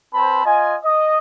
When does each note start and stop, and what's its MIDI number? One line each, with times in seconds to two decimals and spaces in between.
0.13 0.44 60
0.13 0.44 71
0.13 0.44 72
0.13 0.44 81
0.13 0.44 83
0.45 0.76 65
0.45 0.76 75
0.45 0.76 80
0.84 1.18 75